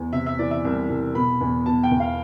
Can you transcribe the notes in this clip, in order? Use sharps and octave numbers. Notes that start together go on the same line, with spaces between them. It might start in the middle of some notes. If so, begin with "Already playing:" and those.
Already playing: E2
C3 E5
E5
E3 D5
E5
C2
C2
B2 B5
E2
B2 A5
G5
E2
F5